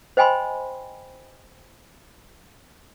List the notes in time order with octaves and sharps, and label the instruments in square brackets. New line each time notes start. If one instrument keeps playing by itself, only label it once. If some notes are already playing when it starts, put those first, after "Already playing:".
[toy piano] C5 D#5 G5 G#5 B5 C6